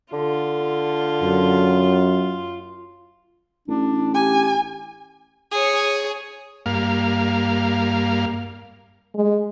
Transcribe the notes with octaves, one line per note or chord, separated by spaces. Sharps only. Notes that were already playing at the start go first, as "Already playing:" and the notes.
D3 F4
F#2
A1 D4
G4 G#5
G#4 C#5
G2 A#3 F5
G#3